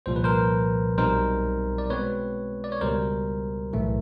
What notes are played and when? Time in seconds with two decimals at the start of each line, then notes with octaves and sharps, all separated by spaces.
0.06 C2 A#2 F3 C5
0.16 B4
0.24 A#4 C5
0.98 B1 B2 G3 C4 D#4 A#4 C5
1.78 D5
1.90 B2 G#3 C4 B4 C#5
2.64 D5
2.72 C#5
2.81 C#2 B2 G3 A#4 C5
3.73 B1 A2 E3 A3